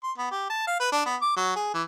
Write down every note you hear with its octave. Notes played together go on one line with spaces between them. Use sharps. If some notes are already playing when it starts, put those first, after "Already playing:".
C6
B3
G4
A5
F5
B4
D4
B3
D6
F#3
G#4
E3